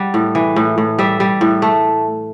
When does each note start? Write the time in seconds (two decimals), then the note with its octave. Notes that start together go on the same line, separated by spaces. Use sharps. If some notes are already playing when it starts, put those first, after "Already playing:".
Already playing: G3 F#5
0.14 A2
0.35 E3
0.56 A2
0.78 A2
0.99 G3 E5
1.20 G3
1.41 A2
1.62 A3